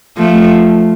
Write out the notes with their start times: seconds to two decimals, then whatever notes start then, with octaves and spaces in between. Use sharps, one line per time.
0.17 F3 A3